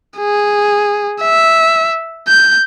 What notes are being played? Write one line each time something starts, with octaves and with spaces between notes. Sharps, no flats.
G#4
E5
G6